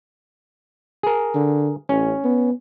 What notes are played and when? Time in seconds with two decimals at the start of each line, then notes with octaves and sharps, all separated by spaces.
1.03 G#4 A#4
1.35 D3
1.89 A1 C#4
2.24 B3